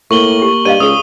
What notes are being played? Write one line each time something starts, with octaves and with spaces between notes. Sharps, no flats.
A2 A#3 C#6 F#7 G7
G4
G2 D5 D#5 F5 D#7
C#2 G#4 A#4 D#6 G7